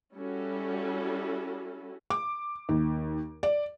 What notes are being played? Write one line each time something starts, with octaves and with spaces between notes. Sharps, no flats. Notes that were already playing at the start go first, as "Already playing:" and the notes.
G3 C#4 E4 F#4 A4
D6
D#2
D5